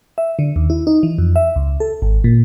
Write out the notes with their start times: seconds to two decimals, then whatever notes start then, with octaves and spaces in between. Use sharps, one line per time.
0.18 E5
0.39 D3
0.56 D#2
0.70 E4
0.87 D#4
1.03 E3
1.18 F2
1.36 E5
1.56 C#2
1.80 A4
2.02 G#1
2.24 A#2